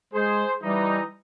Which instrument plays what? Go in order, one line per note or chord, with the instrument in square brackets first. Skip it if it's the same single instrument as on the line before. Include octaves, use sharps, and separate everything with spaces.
[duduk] G#3 [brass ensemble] G#4 C5
[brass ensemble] E3 D#4 [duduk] G3